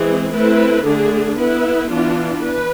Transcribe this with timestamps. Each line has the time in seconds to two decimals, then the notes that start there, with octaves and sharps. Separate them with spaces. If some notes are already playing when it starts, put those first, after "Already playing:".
Already playing: E3 G#3 C4 G#4
0.31 A3 C4 E4 B4
0.84 D3 A3 D4 G#4
1.37 B3 E4 B4
1.90 E3 B3 D4 F4
2.43 B4